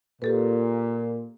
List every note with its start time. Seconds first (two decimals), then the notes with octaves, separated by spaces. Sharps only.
0.22 A#2 G4 A4 B4